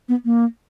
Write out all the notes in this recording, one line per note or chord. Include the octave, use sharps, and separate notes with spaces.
B3
A#3